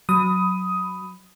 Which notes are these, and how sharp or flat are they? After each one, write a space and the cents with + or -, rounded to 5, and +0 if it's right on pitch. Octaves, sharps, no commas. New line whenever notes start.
F#3 +0 B5 +10 D#6 +10